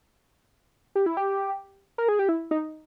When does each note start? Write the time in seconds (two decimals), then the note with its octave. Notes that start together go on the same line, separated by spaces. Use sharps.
0.95 G4
1.06 E4
1.17 G4
1.98 A#4
2.09 G#4
2.19 G4
2.29 E4
2.51 D#4